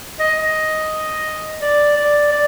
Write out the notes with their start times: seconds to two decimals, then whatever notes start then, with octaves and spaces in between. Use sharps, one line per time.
0.19 D#5
0.39 D#5
1.61 D5
1.97 D5
2.32 D5